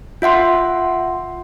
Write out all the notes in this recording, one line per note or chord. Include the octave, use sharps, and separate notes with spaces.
F4 E5 F#5 C6